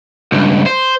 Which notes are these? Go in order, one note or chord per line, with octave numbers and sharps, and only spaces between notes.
C#2 G2
C5